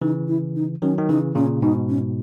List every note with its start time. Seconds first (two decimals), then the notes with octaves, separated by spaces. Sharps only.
0.02 C#3 E3 D#4
0.28 E4
0.56 D#4
0.82 D#3 F#3 C#4
0.98 D#3
1.09 C#3 E3 D#4
1.35 A#2 C#3 C#4
1.62 G#2 B2 D#4
1.89 C#4